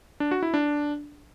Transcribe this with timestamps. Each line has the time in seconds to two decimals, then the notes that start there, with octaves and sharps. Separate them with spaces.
0.20 D4
0.31 F#4
0.43 E4
0.54 D4